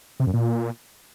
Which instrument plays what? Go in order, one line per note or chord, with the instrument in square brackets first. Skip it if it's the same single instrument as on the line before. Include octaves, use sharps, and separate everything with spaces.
[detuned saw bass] C3
F#2
A#2